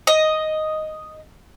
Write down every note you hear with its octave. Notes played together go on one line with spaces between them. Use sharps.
D#5